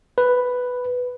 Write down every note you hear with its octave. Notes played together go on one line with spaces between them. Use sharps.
B4